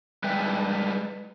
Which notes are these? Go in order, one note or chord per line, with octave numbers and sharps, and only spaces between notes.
G3 G#3 B4 E5 G5